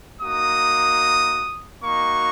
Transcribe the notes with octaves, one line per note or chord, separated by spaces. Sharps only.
A#3 D#4 F#4 D#6
A#3 D#4 F#4 C#6